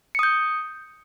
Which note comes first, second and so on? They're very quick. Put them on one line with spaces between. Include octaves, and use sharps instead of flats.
C#7 D#6 G6